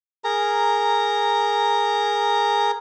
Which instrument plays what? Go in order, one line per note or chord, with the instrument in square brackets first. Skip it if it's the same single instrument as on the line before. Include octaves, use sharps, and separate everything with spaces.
[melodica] G#4 A#4 A#5